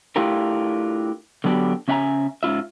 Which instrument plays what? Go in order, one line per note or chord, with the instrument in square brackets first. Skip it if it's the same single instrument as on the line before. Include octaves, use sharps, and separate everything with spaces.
[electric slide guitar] A3 D4 E4 F4 G4 A#4
D3 F#3 B3 D4 F#4 G4
C#3 C#4 E5 F#5 G#5 A#5
G#2 C#4 F4 E5